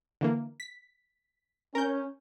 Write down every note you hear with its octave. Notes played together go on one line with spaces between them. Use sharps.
D3 E3 A#3
B6
C#4 A#4 G6